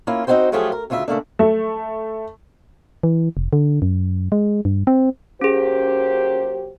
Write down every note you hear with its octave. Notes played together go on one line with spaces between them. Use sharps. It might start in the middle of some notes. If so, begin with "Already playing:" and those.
A#3 C#4 E4 F4
C4 D#4 F4 F#4 C5 G5
F3 F#3 A3 F4 G4 G#4
A#4
D2 C#3 F4 G#4 E5
C#3 A3 A#3 D4
A3
E3
F1
D3
F#2
G#3
G2
C4
F#3 A#3 C#4 G4 G#4 C5